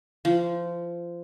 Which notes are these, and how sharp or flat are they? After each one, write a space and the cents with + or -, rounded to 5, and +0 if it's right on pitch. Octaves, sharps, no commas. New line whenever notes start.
F3 -20